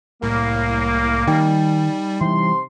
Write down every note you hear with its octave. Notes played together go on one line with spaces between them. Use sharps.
C2 A2 A#3
D#3 G3 D#4 G5
C3 E3 G3 C6